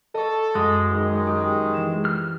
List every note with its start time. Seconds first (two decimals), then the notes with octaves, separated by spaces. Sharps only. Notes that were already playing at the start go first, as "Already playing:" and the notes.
0.15 A4 D#5 C#6
0.55 F#2 G#3 A#6 D#7
0.90 D#3
1.27 G4
1.74 E3 E7
2.05 F6